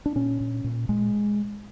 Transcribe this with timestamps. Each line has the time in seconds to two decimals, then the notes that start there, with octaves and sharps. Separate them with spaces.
0.06 D4
0.15 A#2 C#4
0.40 A#2
0.64 A#2
0.89 A#2 G#3